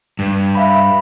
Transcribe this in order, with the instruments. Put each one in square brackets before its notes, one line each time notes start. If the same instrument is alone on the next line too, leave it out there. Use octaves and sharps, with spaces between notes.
[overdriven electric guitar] G2
[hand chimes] E5 F5 B5